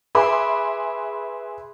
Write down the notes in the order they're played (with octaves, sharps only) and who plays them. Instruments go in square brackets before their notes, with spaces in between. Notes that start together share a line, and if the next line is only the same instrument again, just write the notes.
[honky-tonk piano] G#4 B4 E5 B5 C6 D6